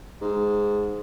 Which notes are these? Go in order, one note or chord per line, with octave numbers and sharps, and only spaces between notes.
G#2